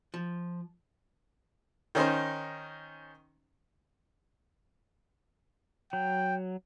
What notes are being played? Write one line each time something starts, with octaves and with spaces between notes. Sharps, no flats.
F3
D#3 C#4 D#4 C5
F#3 G5